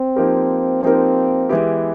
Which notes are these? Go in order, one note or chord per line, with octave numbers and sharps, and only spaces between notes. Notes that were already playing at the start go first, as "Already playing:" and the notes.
Already playing: C4
F3 A#3 D#4 G4 A#4
F3 A#3 C4 D#4 G4 A#4
E3 G#3 B3 E4 G4